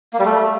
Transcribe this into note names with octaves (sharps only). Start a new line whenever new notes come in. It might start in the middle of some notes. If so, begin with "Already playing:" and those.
A#3
G3
A3